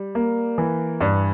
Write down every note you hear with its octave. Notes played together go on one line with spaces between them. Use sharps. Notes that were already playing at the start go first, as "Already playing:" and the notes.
Already playing: G3
A#3
E3
G2